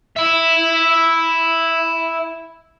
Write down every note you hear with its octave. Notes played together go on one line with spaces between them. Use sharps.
E4 E5